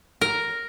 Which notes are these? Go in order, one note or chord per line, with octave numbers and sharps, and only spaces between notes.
A#4